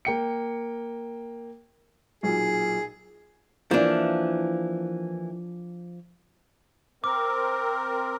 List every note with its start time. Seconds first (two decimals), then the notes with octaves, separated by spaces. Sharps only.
0.05 A#3 G5 C#7
2.23 B1 A#2 G#4
3.71 E3 F3 A#3 D4
7.04 C4 A#4 D6